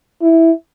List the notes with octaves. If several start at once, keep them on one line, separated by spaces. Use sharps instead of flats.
E4